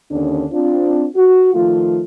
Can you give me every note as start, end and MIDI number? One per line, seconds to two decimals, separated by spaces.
0.11 0.46 39
0.11 0.46 50
0.11 0.46 61
0.11 0.46 62
0.52 1.06 60
0.52 1.06 62
0.52 1.06 65
1.16 1.52 66
1.54 2.02 51
1.54 2.02 53
1.54 2.02 57
1.54 2.02 65